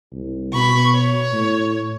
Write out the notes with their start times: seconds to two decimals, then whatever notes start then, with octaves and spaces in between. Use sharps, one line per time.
0.12 C2
0.53 B2 B5 C#6
0.95 C#5
1.33 A2